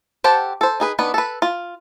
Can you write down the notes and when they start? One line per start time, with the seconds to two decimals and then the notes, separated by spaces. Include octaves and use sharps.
0.24 G4 A4 C5 F#5 A5
0.61 A4 C5
0.80 D#4 G#4 B4
0.99 D#3 B3 D4 B4
1.14 A4 B4
1.42 F4